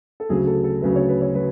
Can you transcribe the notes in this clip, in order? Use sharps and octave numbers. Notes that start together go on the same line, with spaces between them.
A4
D2 C#3 F#3 G#4
A4
A4
D2 C#3 F#3 B4
C#5
B4
C#5
F#3 B4